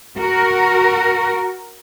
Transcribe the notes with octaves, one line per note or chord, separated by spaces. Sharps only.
F#4 A#4